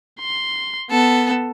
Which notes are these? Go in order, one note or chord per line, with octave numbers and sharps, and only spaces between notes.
C6
B3 A4